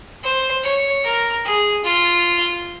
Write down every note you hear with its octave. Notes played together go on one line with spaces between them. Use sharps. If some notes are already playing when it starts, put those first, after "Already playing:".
C5
C#5
A#4
G#4
F4